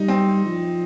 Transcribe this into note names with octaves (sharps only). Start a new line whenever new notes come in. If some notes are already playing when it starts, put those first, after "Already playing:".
Already playing: G3 D#4
C4
F3